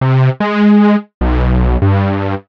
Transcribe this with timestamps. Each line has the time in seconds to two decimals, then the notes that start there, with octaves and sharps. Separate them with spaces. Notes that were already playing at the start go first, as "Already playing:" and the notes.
0.01 C3
0.40 G#3
1.21 B1
1.82 G2